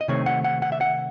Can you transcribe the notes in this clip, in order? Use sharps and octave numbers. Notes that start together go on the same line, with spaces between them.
D#5
C3 D#3 A3 C4 C#5
F#5
F#5
F#5
E5
F#5